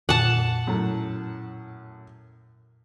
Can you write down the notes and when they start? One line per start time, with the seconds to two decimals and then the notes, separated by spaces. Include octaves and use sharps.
0.09 F2 A#2 F4 F#5 A5
0.67 F#2 A2 A#5